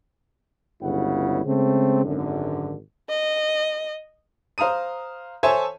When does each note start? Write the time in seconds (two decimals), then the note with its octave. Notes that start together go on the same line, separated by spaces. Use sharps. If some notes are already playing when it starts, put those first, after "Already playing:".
0.82 G1 C#2 C#3 F#3 E4 F#5
1.46 C#3 G#3 A3 C4
2.05 G#1 F#2 D3
3.09 D#5
4.58 C5 F5 A#5 D#6 D#7
5.43 A4 C5 C#5 E5 G#5 A5